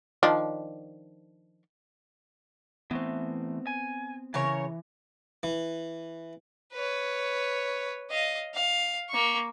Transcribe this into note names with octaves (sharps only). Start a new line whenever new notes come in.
D#3 F3 D4
E3 A3 B3 C4
G#5
C#3 E3 A#4 C#5
E3
B4 C#5
D#5 F5
F5
A#3 C#6